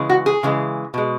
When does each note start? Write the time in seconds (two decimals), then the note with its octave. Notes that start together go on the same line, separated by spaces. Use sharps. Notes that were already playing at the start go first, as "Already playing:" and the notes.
Already playing: C#3 E3 G#3
0.10 F#4
0.26 G#4
0.43 C#3 E3 G#3
0.94 B2 G#3